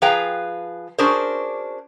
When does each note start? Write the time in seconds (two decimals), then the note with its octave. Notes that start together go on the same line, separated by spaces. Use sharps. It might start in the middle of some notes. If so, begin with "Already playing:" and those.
0.02 F3 G#4 B4 F5 G5 A#5
0.98 C#4 D4 F#4 G#4 A#4 C5